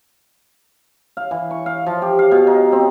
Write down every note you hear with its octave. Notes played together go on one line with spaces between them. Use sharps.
F5
E3
C#6
F5
F3
G4
F5
B2
D#4
C4